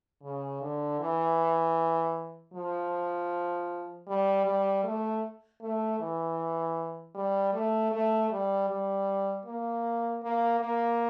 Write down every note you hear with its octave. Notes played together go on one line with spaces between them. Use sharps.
C#3
D3
E3
F3
G3
G3
A3
A3
E3
G3
A3
A3
G3
G3
A#3
A#3
A#3